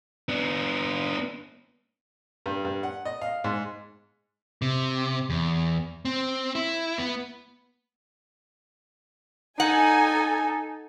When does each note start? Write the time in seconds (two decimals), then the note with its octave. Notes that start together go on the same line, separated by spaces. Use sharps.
0.29 B3 D4
2.46 G2
2.65 G2
2.83 F#5
3.05 D#5
3.21 F5
3.44 G#2
4.62 C3
5.30 E2
6.05 C4
6.55 E4
6.98 B3
9.60 D#4 A4 F#5 G#5